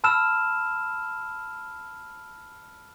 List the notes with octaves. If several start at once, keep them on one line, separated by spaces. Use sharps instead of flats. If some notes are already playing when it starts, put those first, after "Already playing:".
A5 B5 E6 F6 E7